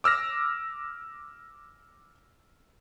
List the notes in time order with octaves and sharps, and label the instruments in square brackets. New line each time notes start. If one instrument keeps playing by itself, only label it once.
[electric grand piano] D6 E6 F6 A#6